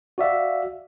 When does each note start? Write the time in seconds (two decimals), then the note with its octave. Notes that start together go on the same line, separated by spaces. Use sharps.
0.18 F#4 D5 E5 F5